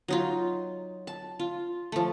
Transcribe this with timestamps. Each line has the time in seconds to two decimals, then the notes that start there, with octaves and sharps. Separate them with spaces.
0.08 F#3 D#4 F4
1.07 A5
1.39 F4
1.92 F3 A3